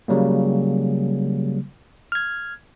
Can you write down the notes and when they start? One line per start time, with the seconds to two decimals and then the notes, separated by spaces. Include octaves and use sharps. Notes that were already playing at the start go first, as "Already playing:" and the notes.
0.08 C#3 F#3 G3 A#3
2.12 F6 G#6